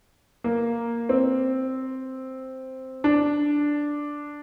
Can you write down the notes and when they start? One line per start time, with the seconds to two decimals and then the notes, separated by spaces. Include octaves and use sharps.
0.44 A#3
1.09 C4
3.04 D4